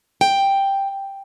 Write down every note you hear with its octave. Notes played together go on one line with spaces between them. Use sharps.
G5